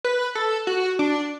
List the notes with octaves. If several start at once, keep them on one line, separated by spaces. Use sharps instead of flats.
B4
A4
F#4
D4